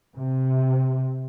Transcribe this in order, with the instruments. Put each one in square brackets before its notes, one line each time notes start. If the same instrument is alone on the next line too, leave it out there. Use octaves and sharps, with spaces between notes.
[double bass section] C3